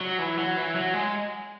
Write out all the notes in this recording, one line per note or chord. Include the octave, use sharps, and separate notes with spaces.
F#3
E3
F#3
E3
F#3
G#3